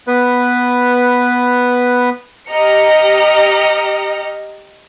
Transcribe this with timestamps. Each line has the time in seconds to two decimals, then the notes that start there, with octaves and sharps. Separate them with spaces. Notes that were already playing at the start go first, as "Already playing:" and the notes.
0.07 B3 B4
2.48 G4 D#5 A#5 F6 C#7